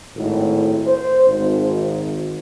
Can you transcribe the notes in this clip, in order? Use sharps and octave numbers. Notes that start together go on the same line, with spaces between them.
G#1 A2
C5
G#1